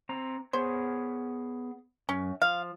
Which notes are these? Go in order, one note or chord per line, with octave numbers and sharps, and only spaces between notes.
C4 A#5
B3 G#4 C5 C#5
F#2 C#4
F3 F5